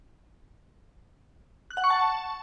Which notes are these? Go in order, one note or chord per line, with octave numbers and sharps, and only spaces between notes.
F#6
F#5
C#6
A5